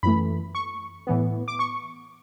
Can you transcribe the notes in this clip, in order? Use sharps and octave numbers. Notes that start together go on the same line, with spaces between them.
F#2 E3 A3 B5
C#6
A2 E3 B3
D6
C#6